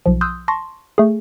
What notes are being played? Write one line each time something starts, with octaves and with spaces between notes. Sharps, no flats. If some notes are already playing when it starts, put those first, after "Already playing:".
B1 F3
C6 D#6 E6 F#6 G6
A5 C6 C#6 A#6
A3 G#4